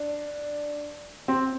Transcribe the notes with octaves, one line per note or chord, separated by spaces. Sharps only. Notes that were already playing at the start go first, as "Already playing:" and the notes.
Already playing: D4
C4